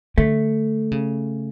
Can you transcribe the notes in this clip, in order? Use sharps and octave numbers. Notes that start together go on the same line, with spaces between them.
D3 A3
C#3